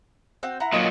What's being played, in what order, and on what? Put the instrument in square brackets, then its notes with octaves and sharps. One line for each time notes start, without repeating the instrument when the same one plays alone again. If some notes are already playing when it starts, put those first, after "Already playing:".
[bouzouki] C4 F#4 G5
E4 F#5 A#5
[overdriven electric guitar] A#2 F#3 [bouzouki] D#5 F5 G#5